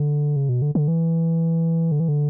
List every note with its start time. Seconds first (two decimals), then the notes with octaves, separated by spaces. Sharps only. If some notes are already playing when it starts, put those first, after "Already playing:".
Already playing: D3
0.36 C#3
0.49 B2
0.62 D3
0.75 D3
0.88 E3
1.92 D3
2.00 E3
2.08 D3